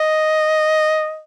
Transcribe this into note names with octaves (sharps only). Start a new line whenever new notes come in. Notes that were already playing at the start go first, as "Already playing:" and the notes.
Already playing: D#5